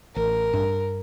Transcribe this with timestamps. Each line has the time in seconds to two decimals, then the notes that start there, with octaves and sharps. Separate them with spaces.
0.16 A1 A#4
0.53 G2